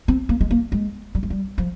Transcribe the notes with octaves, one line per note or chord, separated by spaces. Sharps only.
C4
A#3
G#3
A#3
G#3
G3
G#3
G3
F3